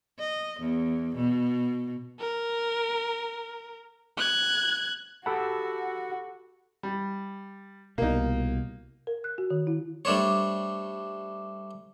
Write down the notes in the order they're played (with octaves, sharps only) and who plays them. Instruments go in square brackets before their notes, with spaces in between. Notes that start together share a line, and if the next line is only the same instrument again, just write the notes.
[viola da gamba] D#5
E2
B2
[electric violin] A#4
F#6 G#6
[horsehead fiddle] F#4 [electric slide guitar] G4 A4 A5 [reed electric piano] F#5 B5 E6
[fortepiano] G3
[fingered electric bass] C2 B2 [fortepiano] A#3 D#4
[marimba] A#4
F#6
F#4
D#3
E4
[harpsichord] G3 A3 D4 C5 C#5